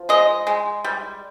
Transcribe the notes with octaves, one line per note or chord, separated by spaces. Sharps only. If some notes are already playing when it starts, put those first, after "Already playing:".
Already playing: F3
G#3 D#5
G#3
G3